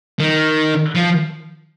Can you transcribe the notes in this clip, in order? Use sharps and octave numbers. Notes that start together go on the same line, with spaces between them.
D#3
F3